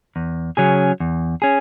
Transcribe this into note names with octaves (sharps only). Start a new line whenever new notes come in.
E2
C#3 F#3 C#4 G#4
E2
C#4 G#4